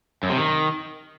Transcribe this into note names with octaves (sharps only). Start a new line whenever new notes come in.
F#2
C3
D#3